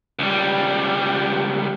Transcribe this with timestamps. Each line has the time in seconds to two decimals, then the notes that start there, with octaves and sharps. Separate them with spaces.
0.19 C#2 G3